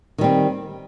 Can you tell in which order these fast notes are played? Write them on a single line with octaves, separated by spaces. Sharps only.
D#3 G3 C4